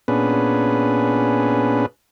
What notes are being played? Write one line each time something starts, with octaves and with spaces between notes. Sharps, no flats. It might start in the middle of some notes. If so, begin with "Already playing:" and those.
A#2 B3 C#4 D4 G#4 B4